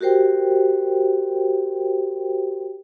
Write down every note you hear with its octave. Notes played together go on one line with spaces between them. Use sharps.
F#4 G4 A#4 C5 G5